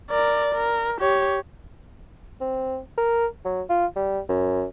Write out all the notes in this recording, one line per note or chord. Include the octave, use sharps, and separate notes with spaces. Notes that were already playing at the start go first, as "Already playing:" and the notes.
A#4 D5
A#4
G4 C#5
C4
A#4
F#3
F4
G3
F#2